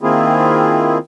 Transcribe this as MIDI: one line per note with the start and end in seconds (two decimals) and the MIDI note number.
0.01 0.98 51
0.01 0.98 58
0.01 0.98 60
0.01 0.98 64
0.01 0.98 65
0.01 0.98 68